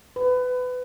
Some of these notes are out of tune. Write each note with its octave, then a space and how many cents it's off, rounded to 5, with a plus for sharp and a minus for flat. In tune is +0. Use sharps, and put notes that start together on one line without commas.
B4 +25